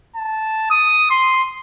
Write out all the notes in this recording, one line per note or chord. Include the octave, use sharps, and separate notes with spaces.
A5
D#6
C6